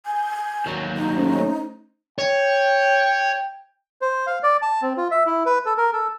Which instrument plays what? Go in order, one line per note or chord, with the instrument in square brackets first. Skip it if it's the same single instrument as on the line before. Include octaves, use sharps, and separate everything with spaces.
[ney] G#5 [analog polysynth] G6
[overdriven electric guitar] D#2 F#3
[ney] D#4
[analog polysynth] A3 C#4 C5
[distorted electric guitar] C#5 [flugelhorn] G5
[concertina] C5
F5
D5
A5
C4
F4
E5
E4
B4
A4
A#4
A4